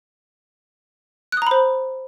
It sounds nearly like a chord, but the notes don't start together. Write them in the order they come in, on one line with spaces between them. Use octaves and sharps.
F#6 D#6 A#5 B5 C5